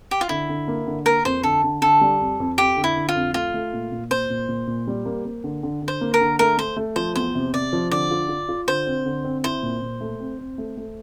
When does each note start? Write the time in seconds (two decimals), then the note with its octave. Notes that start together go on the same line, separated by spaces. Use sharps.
0.11 G4
0.21 F4
0.29 D3 E4
0.49 D3
0.68 A#3
0.87 D3
1.06 A#3 A#4
1.25 F2 C5
1.43 D3 A4
1.64 D3
1.82 D3 A4
2.01 G3
2.21 F2
2.40 F2
2.58 F2 G4
2.77 D3
2.84 E4
2.96 D3
3.09 F4
3.15 F2
3.34 A3 F4
3.54 A3
3.73 A#2
3.92 A#2
4.11 A#2 C5
4.30 A#2
4.48 A#2
4.67 A#2
4.87 G3
5.06 A#3
5.25 A#3
5.44 D3
5.63 D3
5.82 D3
5.88 C5
6.01 A#3
6.14 A#4
6.21 D3
6.39 A3 A#4
6.58 A3 C5
6.77 A3
6.96 F3 C5
7.15 E2 C5
7.35 C3
7.53 C3 D5
7.73 F3
7.91 D3 D5
8.11 F4
8.29 F4
8.49 F4
8.68 D3 C5
8.87 C4
9.06 D3
9.24 C4
9.44 E4 C5
9.63 A#2
9.82 A#2
10.01 A3
10.20 C4
10.39 C4
10.58 A3
10.77 A3